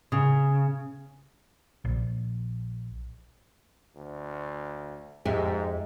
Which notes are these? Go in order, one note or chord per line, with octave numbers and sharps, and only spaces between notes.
C#3
A#1
D2
F2 G#2 G#3 G4 E5